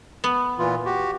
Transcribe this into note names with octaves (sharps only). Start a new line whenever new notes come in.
B3
A#2 E3 F4
F#4 G4